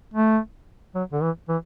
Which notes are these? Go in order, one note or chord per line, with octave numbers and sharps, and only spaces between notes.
A3
F#3
D3
E3
E3